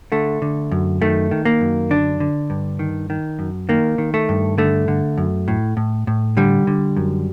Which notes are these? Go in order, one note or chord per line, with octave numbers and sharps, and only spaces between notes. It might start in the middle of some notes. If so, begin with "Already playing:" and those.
D3 A3
D3
F#2
D#3 A3
D#3
A#3
F#2
D3 D4
D3
G2
D#3
D#3
F#2
D#3 A#3
D#3
A3
G2
D3 A3
D3
F#2
A2
A2
A2
D3 G3
D3
F#2